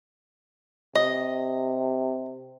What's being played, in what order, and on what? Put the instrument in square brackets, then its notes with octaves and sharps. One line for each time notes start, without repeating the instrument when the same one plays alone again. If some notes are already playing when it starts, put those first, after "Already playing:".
[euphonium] C3 [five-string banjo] D#5